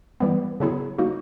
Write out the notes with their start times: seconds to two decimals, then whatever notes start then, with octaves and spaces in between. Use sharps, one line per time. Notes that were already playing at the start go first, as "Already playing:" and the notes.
0.20 E3 G3 B3
0.60 C#3 F#3 B3 E4 G#4
0.98 F#3 A#3 D#4 F#4